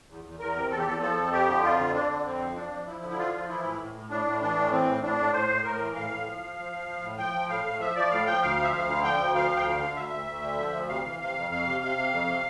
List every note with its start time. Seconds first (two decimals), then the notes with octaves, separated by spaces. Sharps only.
0.09 E2
0.24 E2
0.39 E2 A#4
0.56 C3
0.71 E2 A4
0.79 G4
0.87 E2 A4
1.02 F3 A4
1.17 F2
1.32 F3 G4
1.48 D3
1.63 F2 F4
1.79 D3
1.94 D3 D4
2.09 D3
2.25 F2 C4
2.41 F3
2.56 F3 D4
2.71 F3
2.86 F3 E4
3.03 D3
3.11 E4
3.18 F3 F4
3.33 F3
3.49 E3 E4
3.63 A2
3.80 A2
3.95 A2
4.10 A2 D4
4.26 A2
4.41 E3 D4
4.56 A2
4.71 E3 C4
4.88 A2
5.02 A2 D4
5.18 A2
5.33 A2 C5
5.50 A2
5.64 A2 A#4
5.80 E3
5.96 A2 F5
6.10 A2
6.26 F3
6.42 F3
6.58 F3
6.73 F3
6.88 F3
7.03 A2
7.18 F3 G5
7.34 F3
7.49 A2 F5
7.64 A2
7.80 F3 E5
7.96 F3 D5
8.11 A2 F5
8.26 F3 G5
8.42 D2 F5
8.57 F3
8.64 E5
8.73 D2 F5
8.89 D3
9.03 F3 G5
9.18 D2
9.35 F3 F5
9.50 D2
9.57 G5
9.65 D3 F5
9.80 D3
9.96 D2 E5
10.12 D2
10.26 D2
10.43 D3
10.58 F3
10.73 D2
10.89 C3 F5
11.05 E3
11.20 C3 F5
11.35 F2
11.50 F2 F5
11.66 C3
11.81 C3 F5
11.97 C3
12.12 F2
12.27 C3